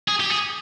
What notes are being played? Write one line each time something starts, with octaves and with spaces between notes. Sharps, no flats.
G#4
G4
G#4